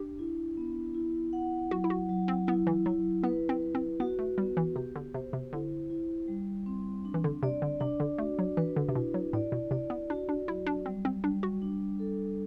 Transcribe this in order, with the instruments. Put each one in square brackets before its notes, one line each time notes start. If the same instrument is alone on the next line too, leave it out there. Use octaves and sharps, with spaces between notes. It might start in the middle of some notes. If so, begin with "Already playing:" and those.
Already playing: [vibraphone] D4 [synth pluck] G4
[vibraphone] E4
B3
E4
F#5
[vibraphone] F#3 [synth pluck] F#4
[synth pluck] E4
F#4
[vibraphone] F#3
[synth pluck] C4
[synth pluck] B3 [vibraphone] E4
[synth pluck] E3
[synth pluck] F#3 [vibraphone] E4
[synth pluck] B3 [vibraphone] B4
[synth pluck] C4
[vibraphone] B4
[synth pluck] C4
[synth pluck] B3 [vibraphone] F#4
[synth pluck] A3
[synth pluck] G3 [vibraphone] B3
[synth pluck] E3
[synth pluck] C3 [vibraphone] G4
[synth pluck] D3
[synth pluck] C3 [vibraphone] C5
[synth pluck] C3
[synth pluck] D3 [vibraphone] E4
[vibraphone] E4
G3
C4
D4
[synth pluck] E3
D3
[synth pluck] C3 [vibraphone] D5
[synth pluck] D3
[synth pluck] C3 [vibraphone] D4
[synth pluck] D3
[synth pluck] A3 [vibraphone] F#4
[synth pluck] F#3
[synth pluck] E3 [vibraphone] B4
[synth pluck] D3
C3
[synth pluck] B2 [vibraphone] E4
[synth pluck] F#3
[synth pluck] A2 [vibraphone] D5
[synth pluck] B2
[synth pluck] C3 [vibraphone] D5
[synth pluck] B3
[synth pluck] D4 [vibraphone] F#4
[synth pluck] D4
[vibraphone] F#3 [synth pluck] E4
[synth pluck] D4
[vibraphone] G3 [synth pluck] C4
[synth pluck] C4
[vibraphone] G3 [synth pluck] D4
[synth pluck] F#4
[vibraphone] D4
A4